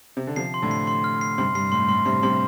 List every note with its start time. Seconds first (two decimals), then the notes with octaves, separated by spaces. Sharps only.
0.17 C3
0.27 D3
0.36 C3 F3 C7
0.54 C6
0.62 A2 D3
0.71 C7
0.87 C6
1.04 F6
1.21 C7
1.38 G2 C3 C6
1.55 G2 C7
1.72 A2 C6
1.89 A2 C6
2.05 G2 C3 C6
2.22 G2 C3 C6